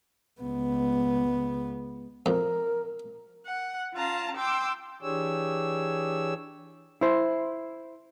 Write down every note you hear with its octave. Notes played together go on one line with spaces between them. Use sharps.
C#2 B3
F2 A#4
F#5
C#4 F4 F5 A5 A#5
G5 C6 D6 E6
E3 D4 G4 G#4 C#5 E6
E4 C5